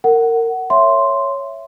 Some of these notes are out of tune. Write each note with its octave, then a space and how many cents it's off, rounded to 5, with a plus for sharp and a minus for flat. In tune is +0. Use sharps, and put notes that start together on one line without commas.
A#4 -25 F#5 +15
C#5 +0 E5 +15 C6 +0